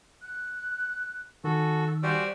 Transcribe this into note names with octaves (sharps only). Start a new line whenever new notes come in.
F#6
D#3 F#4 A4 G#5
E6
G3 F#4 C5 G#5